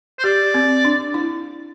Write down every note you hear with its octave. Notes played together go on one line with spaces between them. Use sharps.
C5
G4 D5
C4
D4
E4